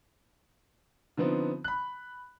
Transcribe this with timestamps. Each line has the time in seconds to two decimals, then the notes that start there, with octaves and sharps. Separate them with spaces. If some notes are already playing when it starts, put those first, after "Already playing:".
1.17 D3 F3 B3 C4 D#4
1.64 B5 F#6